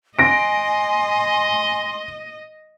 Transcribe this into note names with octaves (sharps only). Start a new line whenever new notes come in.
D#5 G#5 C6 A#6 D7